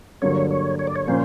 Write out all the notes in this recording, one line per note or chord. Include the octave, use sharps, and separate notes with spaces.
G2 D3 F#3 A#3 C#5
C#5
C#5
D5
C#5
A#2 F3 A#3 C#4 C5